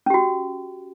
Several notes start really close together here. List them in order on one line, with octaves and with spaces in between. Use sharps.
C#4 G4 F#4